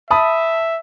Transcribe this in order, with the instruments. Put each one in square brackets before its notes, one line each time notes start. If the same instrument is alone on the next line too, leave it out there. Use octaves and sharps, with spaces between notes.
[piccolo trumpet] E5 [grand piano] A5 B5 D#6